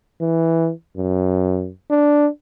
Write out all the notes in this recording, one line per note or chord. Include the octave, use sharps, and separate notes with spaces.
E3
F#2
D4